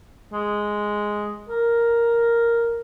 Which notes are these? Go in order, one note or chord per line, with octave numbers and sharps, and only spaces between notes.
G#3
A#4